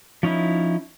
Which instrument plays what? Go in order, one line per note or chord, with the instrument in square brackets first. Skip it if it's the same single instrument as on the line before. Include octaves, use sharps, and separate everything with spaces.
[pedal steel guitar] F3 C#4 D#4 E4